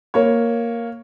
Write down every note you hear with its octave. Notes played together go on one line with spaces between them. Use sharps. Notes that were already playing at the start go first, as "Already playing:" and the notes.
A#3 C#5